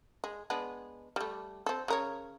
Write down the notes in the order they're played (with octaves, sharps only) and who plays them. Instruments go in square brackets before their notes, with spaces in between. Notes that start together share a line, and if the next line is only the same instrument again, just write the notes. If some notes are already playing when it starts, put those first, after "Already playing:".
[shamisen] G#3
G#3 B3 D4
G3 A3
C4 A4
C#3 A#4 C#5